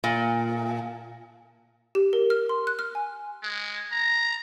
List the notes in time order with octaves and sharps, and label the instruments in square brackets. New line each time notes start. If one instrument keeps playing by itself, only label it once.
[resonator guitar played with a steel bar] A#2
[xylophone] G4
A#4
F6
C6
F#6
F6
G#5
[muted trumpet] G#3
A#5